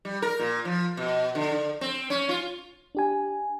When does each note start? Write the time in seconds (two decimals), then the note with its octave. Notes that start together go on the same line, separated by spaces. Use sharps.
0.05 G3
0.22 A#4
0.39 A#2
0.65 F3
0.97 B2
1.35 D3
1.52 D3
1.81 C4
2.10 C#4
2.29 F4
2.95 D4 G4 G#5